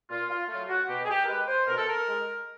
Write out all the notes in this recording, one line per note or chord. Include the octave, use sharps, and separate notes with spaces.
A#2 F4
F4
F#3 A3 F4
F#4
B2 G4
G#4
G4
A#4
G#3 B4
C5
B2 A#4
A4
A#4
G#3